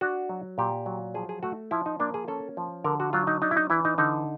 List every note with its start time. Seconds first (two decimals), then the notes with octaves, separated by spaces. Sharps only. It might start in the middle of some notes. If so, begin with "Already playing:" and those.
0.01 D4 F#4
0.29 F#3
0.58 A#2 G4
0.86 F#3
1.14 F3 G#4
1.29 G#4
1.43 A3 F#4
1.71 F3 E4
1.86 D#4
2.00 A#3 D4
2.14 G#4
2.28 C#4 A4
2.57 F3
2.84 D3 A#4
3.00 F#4
3.13 F#3 F4
3.27 D#4
3.42 D4 D#4
3.51 E4
3.57 D#4
3.70 E3 E4
3.85 D#4
3.98 D3 D#4